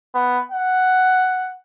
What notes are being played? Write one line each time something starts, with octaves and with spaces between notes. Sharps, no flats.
B3
F#5